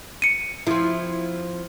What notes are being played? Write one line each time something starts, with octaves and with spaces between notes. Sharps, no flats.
C#7 D#7
F3 C4 E4